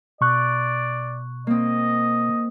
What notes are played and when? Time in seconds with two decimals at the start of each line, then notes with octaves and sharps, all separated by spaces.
0.21 B2 D5 C#6 F#6
1.47 A#3 C4 D#5